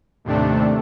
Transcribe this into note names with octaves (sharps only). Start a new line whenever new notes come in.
D#2 A2 C3 A3 D4